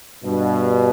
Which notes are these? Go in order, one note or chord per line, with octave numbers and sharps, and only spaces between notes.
G2 B2